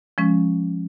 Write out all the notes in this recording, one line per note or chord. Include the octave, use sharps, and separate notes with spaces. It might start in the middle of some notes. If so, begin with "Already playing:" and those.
F3 G#3 C#4